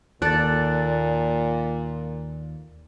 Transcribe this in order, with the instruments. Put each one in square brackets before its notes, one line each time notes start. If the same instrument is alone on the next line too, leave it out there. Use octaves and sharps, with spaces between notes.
[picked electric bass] D#2 [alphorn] A#2 [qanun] A4 D5 [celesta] F#6 A6